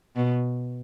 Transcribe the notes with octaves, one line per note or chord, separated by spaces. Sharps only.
B2